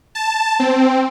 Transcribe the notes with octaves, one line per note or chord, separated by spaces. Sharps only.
A5
C4